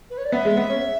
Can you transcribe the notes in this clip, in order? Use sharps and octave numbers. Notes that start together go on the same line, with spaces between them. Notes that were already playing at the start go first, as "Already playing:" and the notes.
B4
C#5
D5
B3 E5
G#3
B3
C#4